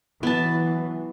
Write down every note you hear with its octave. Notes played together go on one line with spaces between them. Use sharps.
E3 F#3 B3 A5